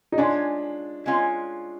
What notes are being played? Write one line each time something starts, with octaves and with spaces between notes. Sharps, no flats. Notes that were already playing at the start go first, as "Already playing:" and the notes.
D#4
G#3 C#4 D4 F4
G#3 C#4 F4